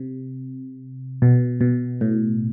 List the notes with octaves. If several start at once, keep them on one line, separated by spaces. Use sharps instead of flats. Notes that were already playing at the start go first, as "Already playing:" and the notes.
Already playing: C3
B2
B2
A2